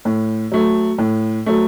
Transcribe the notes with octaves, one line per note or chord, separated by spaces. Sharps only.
A2
F#3 A3
A2
F#3 A3